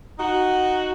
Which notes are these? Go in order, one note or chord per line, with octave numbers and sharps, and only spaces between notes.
D#4 F#4